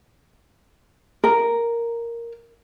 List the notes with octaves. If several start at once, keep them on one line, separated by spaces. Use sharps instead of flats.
A#4